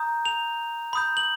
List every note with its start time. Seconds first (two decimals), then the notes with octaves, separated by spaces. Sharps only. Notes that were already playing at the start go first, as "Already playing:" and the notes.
Already playing: A#5 D#6 G6
0.25 F7
0.93 B5 D#6 G6
1.17 F#7